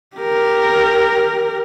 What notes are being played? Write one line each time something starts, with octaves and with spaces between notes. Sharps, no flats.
G4 A#4